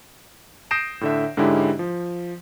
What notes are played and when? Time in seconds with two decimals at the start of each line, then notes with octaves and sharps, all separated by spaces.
0.71 D#6 G6 A#6 C7 D7 E7
1.01 A2 D3 E5
1.37 G#2 D3 G#3 C#4 E4 G4
1.79 F3